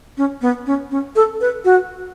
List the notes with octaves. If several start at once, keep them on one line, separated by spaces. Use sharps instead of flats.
C#4
B3
C#4
C#4
A4
B4
F#4